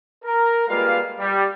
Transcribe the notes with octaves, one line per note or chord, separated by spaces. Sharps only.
A#4
G3 G#3 A#3 F4 B4 F5
G3